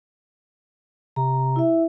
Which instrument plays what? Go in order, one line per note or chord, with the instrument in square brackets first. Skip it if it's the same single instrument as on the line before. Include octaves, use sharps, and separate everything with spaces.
[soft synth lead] C3 [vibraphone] A#5
[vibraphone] E4 E5